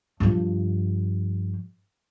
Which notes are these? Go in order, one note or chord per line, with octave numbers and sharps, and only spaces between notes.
G2 F3